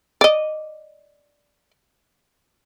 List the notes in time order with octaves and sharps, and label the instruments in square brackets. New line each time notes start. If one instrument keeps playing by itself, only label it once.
[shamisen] D5 D#5